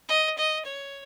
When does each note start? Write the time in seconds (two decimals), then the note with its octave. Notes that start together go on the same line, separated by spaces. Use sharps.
0.09 D#5
0.38 D#5
0.66 C#5